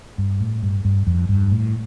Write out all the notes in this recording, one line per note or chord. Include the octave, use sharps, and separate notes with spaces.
G2
A2
G2
G2
F2
G2
A2